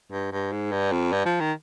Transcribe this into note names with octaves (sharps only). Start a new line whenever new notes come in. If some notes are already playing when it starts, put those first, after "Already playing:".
G2
G2
G#2
G2
F2
G2
F3
D#3